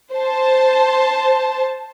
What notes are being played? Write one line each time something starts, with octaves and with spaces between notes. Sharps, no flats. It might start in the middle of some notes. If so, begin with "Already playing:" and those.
C5 A5